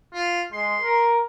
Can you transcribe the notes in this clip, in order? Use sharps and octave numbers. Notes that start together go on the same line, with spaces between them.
F4
G#3 C6
A#4